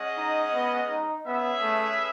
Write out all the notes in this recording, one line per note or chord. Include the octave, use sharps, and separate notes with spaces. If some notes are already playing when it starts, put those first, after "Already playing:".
Already playing: G#3 C#4 G#4 D#5 F#5
D#4
B3
D#4
B3 C#4 G#4 B4 E5
A3